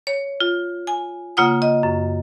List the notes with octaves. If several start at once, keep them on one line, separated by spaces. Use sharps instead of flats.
C#5
F4
G#5
C#3 A#3 F4 F#5 D#6
D#5
F#2